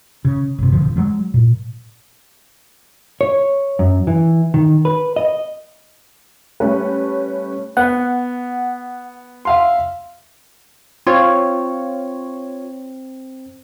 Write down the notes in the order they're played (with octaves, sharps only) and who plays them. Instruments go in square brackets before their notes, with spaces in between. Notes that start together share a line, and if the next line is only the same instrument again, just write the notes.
[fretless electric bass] C#3
G1 C3
D#1 D3 F3
F#3 G#3 A3
A#2
[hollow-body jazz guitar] C#5
F#2
E3
D#3
B4
D#5
[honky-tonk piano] G3 A3 C#4 B4
[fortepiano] B3 [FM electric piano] F#5
[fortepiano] E5 F5 C6
[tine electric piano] C4 [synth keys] F4 C#5